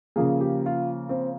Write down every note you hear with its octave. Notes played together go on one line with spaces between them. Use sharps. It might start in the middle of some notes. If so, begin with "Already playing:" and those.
C#3 F3 A#3 G#4
G4
F4
C4